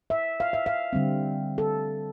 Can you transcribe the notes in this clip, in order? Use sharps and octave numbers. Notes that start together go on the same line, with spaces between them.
E5
F5
E5
F5
D3 G3 C4
A4